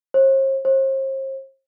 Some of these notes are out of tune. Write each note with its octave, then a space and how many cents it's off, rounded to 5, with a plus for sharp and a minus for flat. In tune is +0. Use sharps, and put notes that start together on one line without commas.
C5 +45
C5 +40